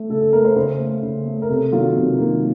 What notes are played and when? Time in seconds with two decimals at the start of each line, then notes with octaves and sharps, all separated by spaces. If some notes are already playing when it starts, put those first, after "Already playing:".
Already playing: A3
0.09 C#3 A4
0.21 A4
0.33 A3 A#4
0.45 C5
0.56 C#3 C5
0.80 A3
1.02 C#3
1.26 A3
1.42 A#4
1.49 C3 A4
1.72 D#3 F#3 A#3 F4
1.96 C3
2.18 D#3 F#3 A#3